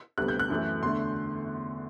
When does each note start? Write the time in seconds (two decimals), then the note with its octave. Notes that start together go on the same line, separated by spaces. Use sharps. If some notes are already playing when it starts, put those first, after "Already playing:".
0.18 D2 C3 G3 B3 F#6
0.28 G6
0.40 F#6
0.50 F#2 E3 A3
0.83 E2 D3 A3 C6